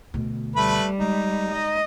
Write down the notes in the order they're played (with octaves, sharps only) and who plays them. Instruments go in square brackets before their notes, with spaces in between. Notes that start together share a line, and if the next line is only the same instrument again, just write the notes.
[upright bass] D2 B2
[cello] G3 [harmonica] A3 B4 B5
[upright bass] G#3 [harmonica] D#4
[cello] D#5